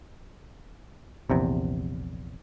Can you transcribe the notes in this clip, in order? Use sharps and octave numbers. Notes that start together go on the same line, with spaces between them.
A#1 E2 C3